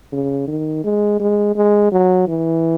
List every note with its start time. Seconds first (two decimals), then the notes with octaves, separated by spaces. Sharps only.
0.12 C#3
0.48 D#3
0.84 G#3
1.20 G#3
1.55 G#3
1.92 F#3
2.28 E3